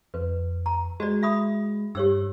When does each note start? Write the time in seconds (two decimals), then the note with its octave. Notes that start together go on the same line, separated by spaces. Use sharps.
0.14 F2 B4
0.66 A#5
1.00 G#3 F#4 D5
1.23 E5 B5 D#6
1.95 G2 G4 C#5 E6